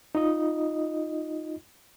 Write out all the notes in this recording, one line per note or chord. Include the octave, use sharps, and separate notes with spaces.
D#4 F4 D#5